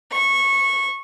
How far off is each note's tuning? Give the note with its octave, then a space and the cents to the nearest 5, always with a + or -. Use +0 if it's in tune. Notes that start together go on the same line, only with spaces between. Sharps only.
C#6 -15